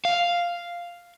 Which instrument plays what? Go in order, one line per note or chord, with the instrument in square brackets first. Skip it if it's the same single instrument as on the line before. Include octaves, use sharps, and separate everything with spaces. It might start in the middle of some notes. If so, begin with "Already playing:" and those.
[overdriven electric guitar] F5